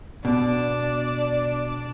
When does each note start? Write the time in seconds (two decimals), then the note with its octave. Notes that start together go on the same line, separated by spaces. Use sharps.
0.25 B2 D4 D5